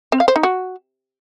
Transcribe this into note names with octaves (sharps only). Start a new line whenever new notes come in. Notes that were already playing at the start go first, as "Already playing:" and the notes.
C4
F5
C5
D#4
F#4